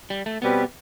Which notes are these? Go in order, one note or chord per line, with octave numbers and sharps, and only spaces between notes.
G3
A3
B2 G3 B3 C4 G4 B4